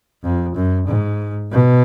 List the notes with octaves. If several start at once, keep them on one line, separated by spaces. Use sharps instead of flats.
F2
F#2
G#2
B2